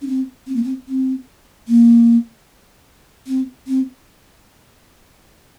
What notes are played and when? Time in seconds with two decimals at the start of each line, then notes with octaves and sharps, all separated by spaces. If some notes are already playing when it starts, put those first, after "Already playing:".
0.01 C#4
0.07 C4
0.47 C4
0.55 A#3
0.63 C4
0.88 C4
1.68 A#3
3.27 C4
3.67 C4